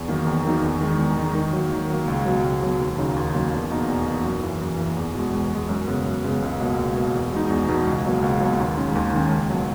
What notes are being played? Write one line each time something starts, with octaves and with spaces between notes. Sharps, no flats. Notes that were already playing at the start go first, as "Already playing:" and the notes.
Already playing: E2
D#3 F#3 A#3 D#4
E2
D#3 F#3 A#3 D#4
E2
D#3 G#3 D#4
E2
D#3 G#3 D#4
D#3
F#3 A#3
D#3
F#3 A#3
C#2
B2 F#3
C#2
B2 F#3
D#2
C#3 F#3 A#3 D#4
D#2
C#3 F#3 A#3 D#4
E2
B2 A#3 D#4
E2
B2 A#3 D#4
F#2
E3 A#3
F#2
E3 A#3
E2
B2 G#3
E2
B2 G#3
F#2
C#3 G#3 B3
F#2
C#3 G#3 B3
C#2
B2 A#3
C#2
B2 A#3
E2
B2 G#3 D#4
E2
B2 G#3 D#4
C#2
B2 F#3 A#3
C#2
B2 F#3 A#3
D#2
D#3 G#3 C#4
D#2
D#3 G#3 C#4
C#2
B2 F#3